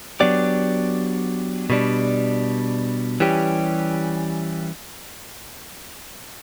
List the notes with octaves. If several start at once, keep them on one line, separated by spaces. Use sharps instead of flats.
F#3 B3 D4 G4 D5
B2 G3 D4
E3 G3 C#4 G4